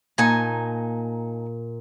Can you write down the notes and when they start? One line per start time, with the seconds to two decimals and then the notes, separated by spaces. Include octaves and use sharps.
0.18 A#2 D#4 G#5 A5